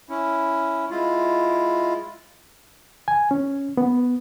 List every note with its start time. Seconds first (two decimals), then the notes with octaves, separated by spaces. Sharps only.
0.10 C#4 E4
0.91 G#3 E4 F4
3.08 G#5
3.31 C#4
3.77 B3